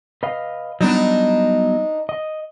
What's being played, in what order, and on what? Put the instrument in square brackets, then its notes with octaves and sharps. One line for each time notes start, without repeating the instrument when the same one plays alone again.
[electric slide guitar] B4 D#5 F5
[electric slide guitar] F#3 G3 B3 [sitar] D4 D#4
[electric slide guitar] D#5